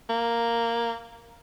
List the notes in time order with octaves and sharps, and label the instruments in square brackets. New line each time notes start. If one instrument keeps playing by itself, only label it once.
[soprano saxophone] A#3